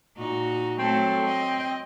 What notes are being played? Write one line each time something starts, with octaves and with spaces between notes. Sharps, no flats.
A#2 D#4 F#4
F#3 A3 C4 A4
D#5